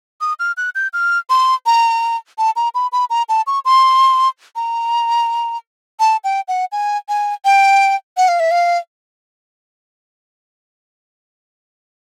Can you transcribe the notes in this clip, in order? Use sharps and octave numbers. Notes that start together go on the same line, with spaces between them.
D#6
F6
F#6
G6
F6
C6
A#5
A5
A#5
B5
B5
A#5
A5
C#6
C6
A#5
A5
G5
F#5
G#5
G#5
G5
F#5
F5
E5
F5